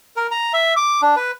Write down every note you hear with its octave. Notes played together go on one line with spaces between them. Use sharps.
A#4
A#5
E5
D6
D4
B4